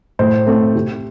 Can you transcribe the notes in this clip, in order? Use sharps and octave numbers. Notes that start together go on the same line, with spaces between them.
A2 C5
A3 C4
C3